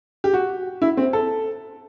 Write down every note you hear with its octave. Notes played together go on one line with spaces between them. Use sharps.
G4
F#4
E4
C4
A4